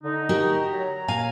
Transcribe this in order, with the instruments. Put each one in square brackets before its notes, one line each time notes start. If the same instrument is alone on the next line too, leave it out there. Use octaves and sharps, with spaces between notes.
[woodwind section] D3 D#4
[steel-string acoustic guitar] F#4 G4 A#4
[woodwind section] F#3 C#5 A#5
[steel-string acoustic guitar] A#2 F5 G#5